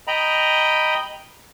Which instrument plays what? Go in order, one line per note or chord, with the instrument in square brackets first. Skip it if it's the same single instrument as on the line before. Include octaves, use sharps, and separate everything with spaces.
[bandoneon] D#5 G5 A#5 B5